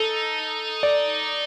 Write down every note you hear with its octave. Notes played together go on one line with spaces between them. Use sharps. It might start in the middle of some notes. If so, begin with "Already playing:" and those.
Already playing: D#4 A4
D5